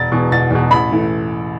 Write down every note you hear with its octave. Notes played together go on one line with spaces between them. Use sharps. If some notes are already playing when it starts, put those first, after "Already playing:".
Already playing: E1 A6
E2 B2
E1 A6
E2 B2
A1 B5
E3 A3